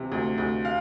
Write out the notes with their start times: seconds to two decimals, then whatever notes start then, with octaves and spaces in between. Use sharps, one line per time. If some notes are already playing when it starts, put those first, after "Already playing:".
Already playing: D2 C3 E3
0.12 D2
0.38 D2
0.65 F5